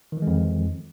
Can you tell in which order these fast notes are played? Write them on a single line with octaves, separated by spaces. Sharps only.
D#3 E3 G#3 F2